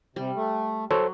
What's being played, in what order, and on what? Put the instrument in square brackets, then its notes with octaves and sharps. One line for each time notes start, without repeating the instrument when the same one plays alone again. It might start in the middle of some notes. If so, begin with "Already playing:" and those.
[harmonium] C3 [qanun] G3
[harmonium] A3
[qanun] F#3 [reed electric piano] A4 C5 C#5